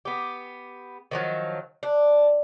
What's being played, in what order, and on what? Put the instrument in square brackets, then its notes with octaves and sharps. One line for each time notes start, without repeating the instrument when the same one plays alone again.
[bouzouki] B3 G4
D#3 F3 F#3
D4